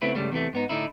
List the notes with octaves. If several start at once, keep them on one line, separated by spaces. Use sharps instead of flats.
C#3 A3 B3 C4 E4 B4
C#2 G2 C#3 G3 A3
E2 C3 E3 A3
G#2 B3 D#4
A2 D3 D#4 E4